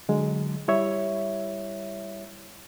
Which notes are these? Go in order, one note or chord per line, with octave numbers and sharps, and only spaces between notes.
D3 F#3 G#3
G3 E4 C#5 E5